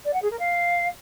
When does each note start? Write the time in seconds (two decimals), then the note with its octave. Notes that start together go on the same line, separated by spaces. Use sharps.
0.05 D5
0.13 F#5
0.22 G#4
0.31 A#4
0.39 F5